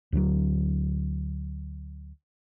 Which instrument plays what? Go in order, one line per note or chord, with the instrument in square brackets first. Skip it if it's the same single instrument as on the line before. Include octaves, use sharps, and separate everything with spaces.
[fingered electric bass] D2 D3 E3 F#3